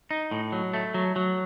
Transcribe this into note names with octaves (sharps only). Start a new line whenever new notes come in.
D#4
A2
F#3
A3
F#3
F#3